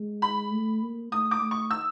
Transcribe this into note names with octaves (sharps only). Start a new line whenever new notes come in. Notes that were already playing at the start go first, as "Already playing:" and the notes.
Already playing: G#3
B5
A3
A#3
A3 D#6
D6
A3
C#6
E6